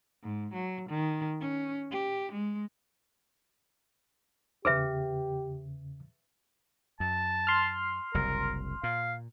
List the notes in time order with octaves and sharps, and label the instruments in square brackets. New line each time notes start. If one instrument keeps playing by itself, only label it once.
[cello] G#2
F#3
D#3
C#4
G4
G#3
[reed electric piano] E2 C#3 [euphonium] G4 [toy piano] G#4 B4 E5
[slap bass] F#2 [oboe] A5
[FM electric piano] C6 F6
[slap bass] F#1 C2 [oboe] A#4
[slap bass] A#2 [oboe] F5